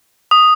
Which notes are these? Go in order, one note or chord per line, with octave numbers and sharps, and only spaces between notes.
D#6